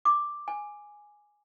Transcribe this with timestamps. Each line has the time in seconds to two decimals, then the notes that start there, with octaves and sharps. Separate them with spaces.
0.05 D6
0.48 G#5